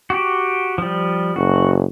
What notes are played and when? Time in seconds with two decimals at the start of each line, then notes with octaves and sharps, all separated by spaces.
0.10 F#4 G4
0.78 F3 G3
1.36 F#1 F#4